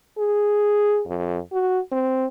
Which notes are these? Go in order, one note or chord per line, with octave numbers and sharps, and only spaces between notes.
G#4
F2
F#4
C4